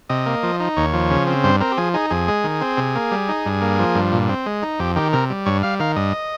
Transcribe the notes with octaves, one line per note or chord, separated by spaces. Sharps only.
C3 D#5
A#3
F3
D#4
D#2 C#5
F3
C#3
C4
G2 C5
C4 A#4
G4
F3 G#4
D#4 G#4
F2 G#4
G#3
D#3
C4
C3
A#3
G3
D#4
G2
A#3
F3
G2
A#2
C4
G#3
D#4
F2 G4
D#3 G4
C3 A#4
G3
G2 C#5
G3 F5
D#3 F5
G2 D#5